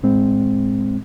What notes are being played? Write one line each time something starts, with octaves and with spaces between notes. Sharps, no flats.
A2 G#3 C4